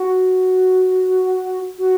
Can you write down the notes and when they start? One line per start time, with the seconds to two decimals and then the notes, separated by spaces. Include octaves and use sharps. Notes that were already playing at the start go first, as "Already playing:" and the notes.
Already playing: F#4
1.78 F#4